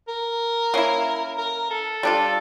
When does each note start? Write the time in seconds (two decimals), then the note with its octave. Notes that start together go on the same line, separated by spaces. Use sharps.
0.08 A#4
0.74 A#3 C#4 E4
1.38 A#4
1.70 A4
2.03 G3 D4 F4 A4